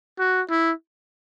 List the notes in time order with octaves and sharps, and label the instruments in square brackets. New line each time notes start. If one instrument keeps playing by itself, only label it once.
[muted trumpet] F#4
E4